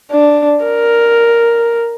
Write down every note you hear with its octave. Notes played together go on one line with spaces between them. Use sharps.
D4
A#4